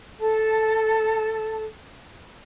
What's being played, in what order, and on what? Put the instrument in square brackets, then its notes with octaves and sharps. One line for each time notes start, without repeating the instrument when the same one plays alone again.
[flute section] A4 A5